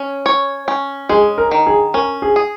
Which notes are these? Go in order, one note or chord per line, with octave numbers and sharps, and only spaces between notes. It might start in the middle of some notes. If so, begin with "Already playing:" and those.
Already playing: C#4
C#5
C#4
G#3 G#4
A#4
D#3
G#4
C#4 A#4
G#4
G#4